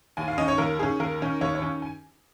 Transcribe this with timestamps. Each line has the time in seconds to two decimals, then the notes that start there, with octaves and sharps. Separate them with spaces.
0.17 D#2 G#5
0.28 F5
0.38 D#3 C#4 D#5
0.48 C#5
0.58 D#2 A#4
0.79 D#3 C#4 G#4
0.99 D#2 A#4
1.20 D#3 C#4
1.41 D#2 C#5
1.55 C#5
1.62 D#3 C#4
1.82 G#5